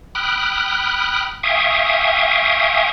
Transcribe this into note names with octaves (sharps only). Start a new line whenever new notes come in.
G5 B5 D#6 F6 F#6
E5 F5 G5 G#5 C#6 D#6